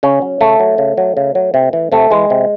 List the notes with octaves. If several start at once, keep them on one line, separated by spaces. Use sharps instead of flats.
C#3 C#4
F#3
C#3 A3
F#3
C#3
F#3
C#3
F#3
C3
E3
C3 A3
E3 G#3
C3